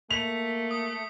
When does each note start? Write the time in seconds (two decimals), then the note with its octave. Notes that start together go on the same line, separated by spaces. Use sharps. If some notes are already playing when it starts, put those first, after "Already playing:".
0.11 A3 A#3 B6 F7
0.71 D#6